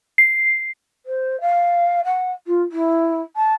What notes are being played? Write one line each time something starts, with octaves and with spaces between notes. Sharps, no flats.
C7
C5
F5
F#5
F4
E4
A5